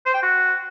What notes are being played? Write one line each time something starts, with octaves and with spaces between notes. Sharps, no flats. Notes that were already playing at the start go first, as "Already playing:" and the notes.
C5
G5
F#4